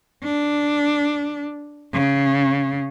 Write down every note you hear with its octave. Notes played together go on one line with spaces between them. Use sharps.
D4
C#3